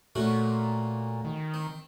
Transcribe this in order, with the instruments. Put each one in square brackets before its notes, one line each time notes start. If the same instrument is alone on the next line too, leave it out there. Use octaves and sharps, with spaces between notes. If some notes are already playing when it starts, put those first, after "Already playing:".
[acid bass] A#2 [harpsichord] A3 C#4 F#4
[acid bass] D#3
[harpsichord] C4